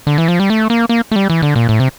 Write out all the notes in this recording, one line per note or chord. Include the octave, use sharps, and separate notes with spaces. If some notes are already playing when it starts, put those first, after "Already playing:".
D3
E3
F3
G3
A3
A#3
A#3
A3
G3
E3
D3
A#2
A2
C3